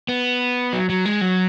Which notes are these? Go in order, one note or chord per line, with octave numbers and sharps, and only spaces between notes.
B3
F#3
F#3
G#3
F#3